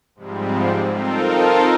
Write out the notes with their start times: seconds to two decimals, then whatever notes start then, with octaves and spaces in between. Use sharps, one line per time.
0.15 G#2 C3 F3 G3 G#3 C4
0.91 C4 D#4 F4 A4 A#4